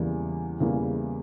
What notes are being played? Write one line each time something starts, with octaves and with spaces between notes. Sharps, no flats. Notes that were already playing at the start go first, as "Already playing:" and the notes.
Already playing: E2 C#3 E3 G3 A#3
E2 C#3 E3 G3 A#3